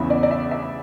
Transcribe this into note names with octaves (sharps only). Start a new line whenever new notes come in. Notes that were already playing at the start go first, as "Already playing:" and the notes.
Already playing: E2 C#3 E3 B3 E5
D5
D5
E5
E5